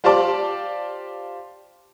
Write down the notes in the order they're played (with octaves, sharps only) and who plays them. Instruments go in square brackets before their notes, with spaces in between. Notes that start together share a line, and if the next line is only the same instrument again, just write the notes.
[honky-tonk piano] F4 G4 C5 D5 A5 D6